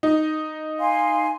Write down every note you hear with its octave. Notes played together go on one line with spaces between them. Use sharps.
D#4
F5 G#5 C6